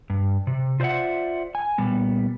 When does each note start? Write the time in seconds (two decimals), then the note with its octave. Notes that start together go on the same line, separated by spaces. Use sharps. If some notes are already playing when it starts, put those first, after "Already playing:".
0.10 G2
0.47 C3
0.80 F4 C5 D5 E5 F#5
1.55 G#5
1.78 A#2 G3 B3